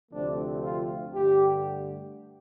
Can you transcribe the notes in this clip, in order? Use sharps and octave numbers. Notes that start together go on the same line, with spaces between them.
D2 C3 F3 A3 C4 D4
F4
G2 D3 A3 G4